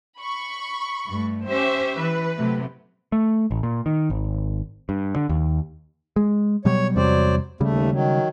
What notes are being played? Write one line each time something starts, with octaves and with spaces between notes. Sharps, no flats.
B5 C#6
G2 A3
C#4 G4 C5 E5
E3 B4
C3 F#3 A3
A3
A1
A#2
D#3
G#1
G2
D3
D#2
G#3
B2 F#3 G3 C#5
E2 C3 F#3 G3 C5 D5
D#2 C#3 G3 A3
D#3 F#3